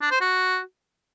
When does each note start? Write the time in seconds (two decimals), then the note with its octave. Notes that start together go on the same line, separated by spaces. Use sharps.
0.01 D4
0.11 C5
0.21 F#4